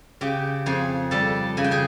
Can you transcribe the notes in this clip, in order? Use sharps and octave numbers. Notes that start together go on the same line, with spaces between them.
C#3 G4 G5
F2 G#4 G#5
G3 A4 A5
C#3 G#5
G5
G#4 G#5